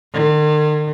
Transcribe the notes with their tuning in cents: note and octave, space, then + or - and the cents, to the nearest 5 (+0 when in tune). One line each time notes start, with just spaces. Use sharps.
D#3 -45